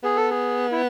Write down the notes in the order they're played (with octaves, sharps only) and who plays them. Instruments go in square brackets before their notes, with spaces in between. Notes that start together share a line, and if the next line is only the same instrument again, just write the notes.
[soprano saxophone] B3 [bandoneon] G#4
[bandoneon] A4
G#4
E4